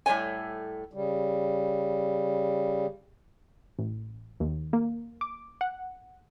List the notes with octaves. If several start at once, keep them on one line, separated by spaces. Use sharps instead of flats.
A2 G3 A3 C#5 G#5
C#3 G3
A1
D#2
A#3
D6
F#5